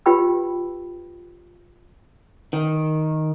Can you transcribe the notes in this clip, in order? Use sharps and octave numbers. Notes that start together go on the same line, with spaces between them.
F4 G4 B4 G5 B5 E6
D#3